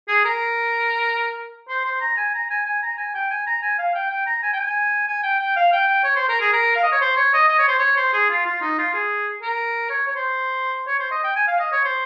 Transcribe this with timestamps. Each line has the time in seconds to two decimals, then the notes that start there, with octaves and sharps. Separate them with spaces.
0.08 G#4
0.25 A#4
1.69 C5
1.85 C5
2.01 A#5
2.17 G#5
2.34 A#5
2.50 G#5
2.66 G#5
2.82 A#5
2.98 G#5
3.15 G5
3.31 G#5
3.47 A#5
3.62 G#5
3.78 F5
3.95 G5
4.10 G5
4.27 A#5
4.42 G#5
4.53 G5
4.60 G#5
5.07 G#5
5.23 G5
5.39 G5
5.56 F5
5.72 G5
5.87 G5
6.04 C#5
6.16 C5
6.28 A#4
6.41 G#4
6.53 A#4
6.76 F5
6.83 D#5
6.92 C#5
7.01 C5
7.16 C#5
7.33 D#5
7.48 D#5
7.58 C#5
7.68 C5
7.79 C#5
7.97 C5
8.13 G#4
8.30 F4
8.46 F4
8.61 D#4
8.78 F4
8.94 G#4
9.42 A#4
9.90 C#5
10.07 C#5
10.15 C5
10.87 C#5
10.99 C5
11.11 D#5
11.24 G5
11.36 G#5
11.48 F5
11.59 D#5
11.72 C#5
11.84 C5